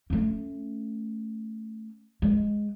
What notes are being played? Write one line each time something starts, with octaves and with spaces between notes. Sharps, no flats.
A3 C#4
G#3